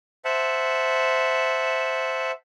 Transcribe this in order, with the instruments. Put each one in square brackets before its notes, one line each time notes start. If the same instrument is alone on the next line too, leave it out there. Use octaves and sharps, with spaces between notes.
[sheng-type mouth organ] C5 E5 F#5 A5